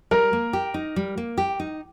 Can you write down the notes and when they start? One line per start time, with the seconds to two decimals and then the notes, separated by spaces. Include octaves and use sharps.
0.11 G3 A#4
0.33 A#3
0.53 G4
0.74 D#4
0.96 G3
1.18 A#3
1.38 G4
1.60 D#4